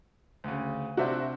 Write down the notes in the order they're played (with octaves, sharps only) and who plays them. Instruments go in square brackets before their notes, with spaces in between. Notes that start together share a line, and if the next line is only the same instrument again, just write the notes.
[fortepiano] D2 C#3
[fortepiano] C3 D4 C5 [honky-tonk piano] F#4 E5